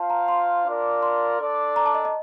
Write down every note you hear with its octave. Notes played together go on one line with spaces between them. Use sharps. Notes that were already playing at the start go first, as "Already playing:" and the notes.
Already playing: F4 C5 F5 A5
A#5
C6
D4 F4 A#4 D5
C6
D4 A4 D5
A#5
A5
D#5
D#5